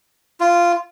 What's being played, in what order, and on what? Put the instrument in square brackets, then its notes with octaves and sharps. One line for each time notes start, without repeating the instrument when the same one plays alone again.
[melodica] F4